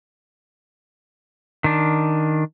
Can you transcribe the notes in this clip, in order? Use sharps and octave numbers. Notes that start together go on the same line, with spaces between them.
D#3 D4